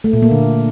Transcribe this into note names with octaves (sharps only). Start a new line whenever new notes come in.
A3
A#2
A#3
D3